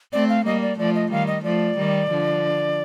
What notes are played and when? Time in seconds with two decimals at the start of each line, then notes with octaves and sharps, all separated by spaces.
0.13 A3 C4 D5
0.29 F5
0.46 G3 A#3 D#5
0.62 D5
0.79 F3 A3 D5
0.95 D#5
1.11 D#3 G3 F5
1.27 D#5
1.44 F3 A3 D5
1.77 D#3 G3
2.10 D3 F3